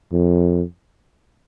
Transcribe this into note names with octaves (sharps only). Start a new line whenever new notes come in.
F2